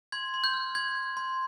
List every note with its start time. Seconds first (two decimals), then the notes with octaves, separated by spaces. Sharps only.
0.12 C6 G#6
0.34 C6
0.44 G6
0.54 F6
0.75 C6 G#6
0.95 G6
1.17 C6